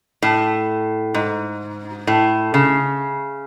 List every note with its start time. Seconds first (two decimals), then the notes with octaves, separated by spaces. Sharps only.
0.22 A2
1.14 G#2
2.07 A2
2.54 C#3